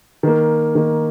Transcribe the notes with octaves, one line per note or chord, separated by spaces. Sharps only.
D#3 A#3
D#3 A#3